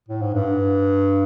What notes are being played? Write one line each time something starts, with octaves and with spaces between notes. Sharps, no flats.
A2
G#2
G2